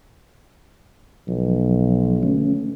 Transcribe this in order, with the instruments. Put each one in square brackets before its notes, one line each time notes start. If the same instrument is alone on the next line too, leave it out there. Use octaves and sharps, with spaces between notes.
[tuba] B1 [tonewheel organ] F3
[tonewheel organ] D3 A3 C#4